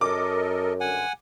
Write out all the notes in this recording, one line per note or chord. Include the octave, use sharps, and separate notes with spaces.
F#2 A4 A#4 D#5 D6
G2 D3 F#5 G#5